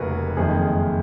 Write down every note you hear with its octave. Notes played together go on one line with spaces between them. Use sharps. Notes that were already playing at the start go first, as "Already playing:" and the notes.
Already playing: F1 D#2 C#3 F#4 G#4 A#4 B4
F#1 F2 D#3 G#3 G#4